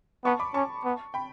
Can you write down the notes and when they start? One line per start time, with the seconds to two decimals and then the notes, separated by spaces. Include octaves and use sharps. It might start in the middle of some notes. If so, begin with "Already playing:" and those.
0.25 B3 A5 C#6
0.39 B5 D6
0.54 C#4 A5 C#6
0.84 B3
1.14 G5 B5